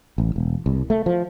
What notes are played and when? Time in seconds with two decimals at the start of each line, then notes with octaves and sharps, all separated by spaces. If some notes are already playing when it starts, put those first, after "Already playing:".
0.18 A1
0.36 E1
0.66 C2
0.90 A3
1.06 F3